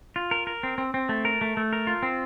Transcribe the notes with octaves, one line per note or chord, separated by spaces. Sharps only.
F4
A#4
A#4
C4
C4
C4
A3
A#4
A3
A3
A#4
F4
C4